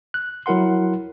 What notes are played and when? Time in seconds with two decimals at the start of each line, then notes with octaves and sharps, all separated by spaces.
0.14 F#6
0.46 F#3 E4 A#4 F#5 C6